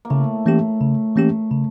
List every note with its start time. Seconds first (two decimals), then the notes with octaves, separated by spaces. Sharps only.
0.05 A#3
0.10 A2 C#3 A3
0.46 E3 A#3 C#4 G4
0.81 C#3
1.16 E3 A#3 C#4 G4
1.51 C#3